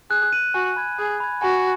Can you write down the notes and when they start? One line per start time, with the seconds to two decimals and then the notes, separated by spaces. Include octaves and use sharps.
0.10 G#4 F#6
0.33 D#7 F#7
0.54 F#4 G#5
0.76 B5 G#6
0.99 G#4 G#5
1.20 B5 G#6
1.42 F#4 G#5